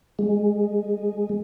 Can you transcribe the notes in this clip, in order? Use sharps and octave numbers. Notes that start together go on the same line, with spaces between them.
G#3